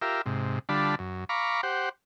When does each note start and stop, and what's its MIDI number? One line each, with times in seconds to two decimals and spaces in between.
0.02 0.22 65
0.02 0.22 67
0.02 0.22 70
0.02 0.22 76
0.26 0.59 44
0.26 0.59 48
0.69 0.95 50
0.69 0.95 55
0.69 0.95 62
0.69 0.95 65
0.69 0.95 81
0.69 0.95 83
0.99 1.25 42
1.29 1.61 77
1.29 1.61 82
1.29 1.61 83
1.29 1.61 85
1.29 1.61 86
1.63 1.89 67
1.63 1.89 72
1.63 1.89 78